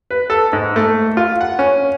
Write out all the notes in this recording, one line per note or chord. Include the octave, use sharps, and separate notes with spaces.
B4
A4
G#2
A3
F4
F#5
C#4